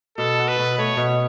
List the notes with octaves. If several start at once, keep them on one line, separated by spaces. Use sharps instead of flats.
B2 A4
F#4
B4
B2
A3 C#5
B2